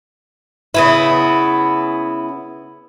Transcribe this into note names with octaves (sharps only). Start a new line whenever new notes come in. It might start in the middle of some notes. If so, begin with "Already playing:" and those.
C#3 B3 E4